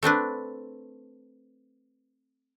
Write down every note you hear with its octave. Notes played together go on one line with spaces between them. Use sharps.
A3 C4 D4 B4